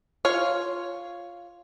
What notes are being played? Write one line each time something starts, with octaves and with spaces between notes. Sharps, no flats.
F4 C#5 F5